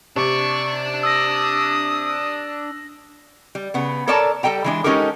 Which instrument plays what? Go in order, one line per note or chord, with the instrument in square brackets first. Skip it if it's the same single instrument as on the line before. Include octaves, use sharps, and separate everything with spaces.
[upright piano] C3 [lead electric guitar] D4 D5 [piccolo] C#6
[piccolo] D#6 [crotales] E6 A#6
[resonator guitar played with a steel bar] G3
C#3 B3
A4 A#4 C#5 D5 A5 A#5
G3 A4 D#5 G5 A#5
E3 G#3 D4
G#3 C#4 D#4 G4 A4 A#4